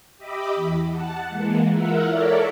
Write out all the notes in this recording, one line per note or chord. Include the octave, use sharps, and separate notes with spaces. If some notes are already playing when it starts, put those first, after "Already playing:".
G4 D#5 E5 B5 D6
E2
F#5 A5
E3 G#3 A#3
E4 F4 A#4 E5 F#5
A4 A#4 C#5 D5 E5